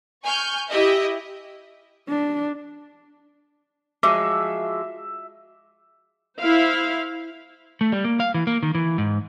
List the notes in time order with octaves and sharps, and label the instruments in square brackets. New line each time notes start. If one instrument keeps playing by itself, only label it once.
[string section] G#5 C#6 F6 G6
E4 G4 D#5 E5
[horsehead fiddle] D4
[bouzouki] F3 F#3 G#3 [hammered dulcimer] E5 [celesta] D6
[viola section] E4 C5 F5
[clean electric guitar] A3
G3
A#3
F5
E3
A#3
D#3
E3
G#2